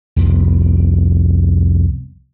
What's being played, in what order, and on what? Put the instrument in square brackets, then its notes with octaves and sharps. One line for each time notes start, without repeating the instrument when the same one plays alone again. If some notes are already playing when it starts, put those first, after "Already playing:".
[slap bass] C2 F2 B3